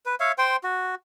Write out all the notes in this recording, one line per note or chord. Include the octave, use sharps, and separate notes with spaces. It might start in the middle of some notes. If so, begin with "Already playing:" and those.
B4
C#5 E5 F5
C5 G5 C6
F#4